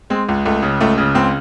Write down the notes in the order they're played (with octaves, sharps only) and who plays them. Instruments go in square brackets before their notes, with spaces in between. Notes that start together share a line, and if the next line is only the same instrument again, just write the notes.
[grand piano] G#3 C4
C#2
C#2 A3
C#3
C#2 A3
C#3
C#2 C4